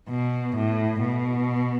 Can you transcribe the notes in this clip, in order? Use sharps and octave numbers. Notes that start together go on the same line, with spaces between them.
B2
A2
B2